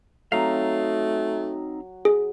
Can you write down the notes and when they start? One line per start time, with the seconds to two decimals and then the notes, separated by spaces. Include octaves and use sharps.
0.32 F#3 A3 C4 D#4 F5
2.05 G#4